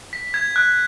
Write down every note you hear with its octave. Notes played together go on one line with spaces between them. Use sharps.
B6
G#6
F#6